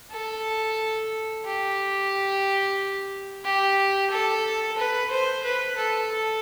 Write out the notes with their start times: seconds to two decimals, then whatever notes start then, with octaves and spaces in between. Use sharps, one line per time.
0.12 A4
1.45 G4
3.45 G4
4.11 A4
4.78 B4
5.11 C5
5.44 B4
5.78 A4
6.12 A4